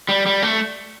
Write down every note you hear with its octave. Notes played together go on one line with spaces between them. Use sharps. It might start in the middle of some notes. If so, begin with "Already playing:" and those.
G3
G3
A3